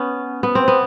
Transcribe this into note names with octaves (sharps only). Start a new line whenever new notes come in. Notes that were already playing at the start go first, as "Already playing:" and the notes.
Already playing: B3 C#4
B3
C4
B3